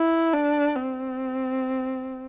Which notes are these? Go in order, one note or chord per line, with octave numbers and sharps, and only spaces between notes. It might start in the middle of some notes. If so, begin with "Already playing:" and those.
Already playing: E4
D4
C4